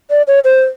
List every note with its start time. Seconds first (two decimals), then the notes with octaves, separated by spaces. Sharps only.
0.10 D5
0.27 C#5
0.44 C5